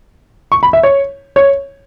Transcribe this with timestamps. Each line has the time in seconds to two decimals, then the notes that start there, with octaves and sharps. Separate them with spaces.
0.52 C#6
0.63 B5
0.73 E5
0.83 C#5
1.36 C#5